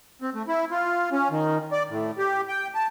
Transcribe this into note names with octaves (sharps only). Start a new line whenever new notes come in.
C4
A3
E4
F4
C#4
D#3
D5
A2
G4
G5
A5